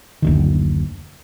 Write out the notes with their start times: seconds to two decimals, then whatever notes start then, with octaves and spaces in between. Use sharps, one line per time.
0.22 F#1 D2 D#3